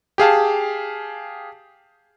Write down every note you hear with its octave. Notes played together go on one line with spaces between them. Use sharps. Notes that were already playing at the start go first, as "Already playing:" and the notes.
G4 G#4 F5 A5